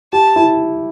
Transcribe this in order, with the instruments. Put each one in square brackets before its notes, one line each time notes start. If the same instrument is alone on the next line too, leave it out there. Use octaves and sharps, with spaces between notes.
[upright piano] G4 [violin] A5
[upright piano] E4